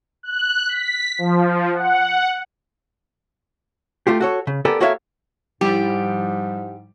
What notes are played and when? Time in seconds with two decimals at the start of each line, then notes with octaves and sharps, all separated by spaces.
0.23 F#6
0.67 B6
1.18 F3
1.74 F#5
4.07 A3 F4 G4
4.21 F#4 A4 C#5
4.47 C#3
4.65 B3 G4 A4 A#4 D5 G#5
4.80 A#3 F#4 A4 C#5 E5 F5
5.61 G#2 F3 G3 E4 G4